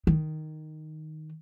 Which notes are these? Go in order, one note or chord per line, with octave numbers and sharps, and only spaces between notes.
D#3